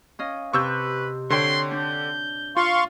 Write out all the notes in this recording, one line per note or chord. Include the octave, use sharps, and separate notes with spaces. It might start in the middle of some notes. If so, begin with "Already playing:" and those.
C#4 D#5 F5
C3 B4 C#6 E6 F#6 G6
D3 C5 C#5 G5 C6 C7
D4 G6
F4 F5 C6 C#6